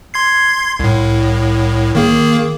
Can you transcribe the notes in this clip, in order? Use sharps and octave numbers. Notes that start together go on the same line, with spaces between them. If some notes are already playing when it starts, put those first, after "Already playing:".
C6 G#6 C7
C2 A2
D#3 A#3 G#4